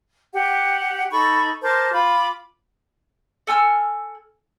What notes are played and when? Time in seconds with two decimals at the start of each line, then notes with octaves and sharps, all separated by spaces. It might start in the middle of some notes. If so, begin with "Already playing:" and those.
0.34 G4 F#5
1.12 D#4 A4 B5 C#6
1.62 A#4 C5 A5 D6
1.92 F4 B5 D6
3.47 A4 G#5 E6 F6